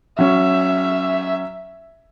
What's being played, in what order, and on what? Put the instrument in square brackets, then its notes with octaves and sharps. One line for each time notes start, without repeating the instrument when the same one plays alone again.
[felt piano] F#3 C#4 [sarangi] E5